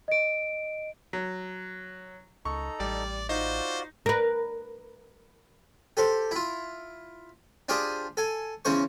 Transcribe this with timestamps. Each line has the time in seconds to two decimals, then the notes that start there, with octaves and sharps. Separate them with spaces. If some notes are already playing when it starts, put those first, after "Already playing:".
0.08 D#5 D7
1.13 F#3
2.45 C#2 D#4 A4 A#5 C#6
2.80 A1 G3 D5
3.29 D#4 F4 F#4 C5 D5
4.06 A#4 B4
5.97 G4 A4 C5
6.31 E4 F4
7.69 D4 F4 G4 G#4 C5
8.17 A4 G#5
8.65 E2 C#3 C#4 C5 C#6